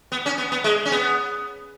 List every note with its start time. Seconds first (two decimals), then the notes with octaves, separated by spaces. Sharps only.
0.12 B3
0.26 C#4
0.38 B3
0.52 B3
0.64 G#3
0.85 C#4
0.92 B3